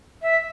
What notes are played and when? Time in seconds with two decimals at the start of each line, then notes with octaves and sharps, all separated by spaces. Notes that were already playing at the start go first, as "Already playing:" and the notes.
0.22 E5